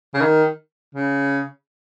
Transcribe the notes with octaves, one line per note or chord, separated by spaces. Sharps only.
C#3
D#3
C#3